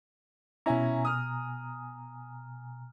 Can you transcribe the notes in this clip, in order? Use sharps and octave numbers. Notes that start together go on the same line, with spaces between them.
B2 C#4 E4 G#5 A#5
D#6 F6